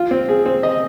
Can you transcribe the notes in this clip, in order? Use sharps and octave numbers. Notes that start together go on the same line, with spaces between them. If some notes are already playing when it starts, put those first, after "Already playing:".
Already playing: F4
C4
G#4
C4
D#5